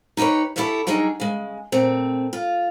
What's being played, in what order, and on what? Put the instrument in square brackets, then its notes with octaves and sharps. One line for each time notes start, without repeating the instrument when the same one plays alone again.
[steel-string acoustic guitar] D#4 G4 A#4 B4 C#5
E4 G4 A4 C#5 E5 F5
F#3 G3 D4 D#4 G#4
C#3 G#3
A#2 A3 C4
F4